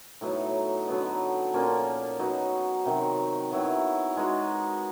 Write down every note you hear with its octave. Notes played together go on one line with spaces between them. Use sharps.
A2 F#3 B3 D#4
D3 F#3 B3 D#4
A#2 F3 A#3 C#4
F#3 B3 D#4 F#4
C3 D#3 F#3
D#3 F#3 B3 E4
G#3 B3 D#4 F#4